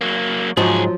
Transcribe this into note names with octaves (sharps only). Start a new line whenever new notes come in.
F#3 A#3
C#2 G#2 F3 F#3 G#4